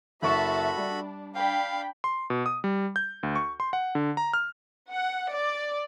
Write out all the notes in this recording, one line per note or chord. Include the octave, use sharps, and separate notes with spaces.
F#1 F#4 A4 E5 A5 B5 C#6
G3 D4
D4 F5 G5 B5
C6
B2
D#6
G3
G6
D2
C#6
C6
F#5
D3
A#5
F6
F#5
D5